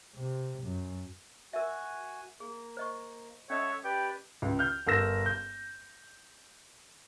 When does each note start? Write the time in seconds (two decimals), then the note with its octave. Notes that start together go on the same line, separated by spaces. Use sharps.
0.15 C3
0.63 F#2
1.53 F#4 A#4 E5 G#5
2.40 A#3 G#4
2.77 C5 D#5 C#6
3.50 C#4 A4 C#5 D#5 E5 F#5 D#6
3.84 G4 B4 D5 G5
4.42 C#2
4.59 F6 G6
4.87 G1 A#4 E6 A#6 E7
5.26 G6